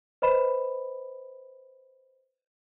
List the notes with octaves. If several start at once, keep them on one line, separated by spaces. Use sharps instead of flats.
B4 C5 D#5 B5 E7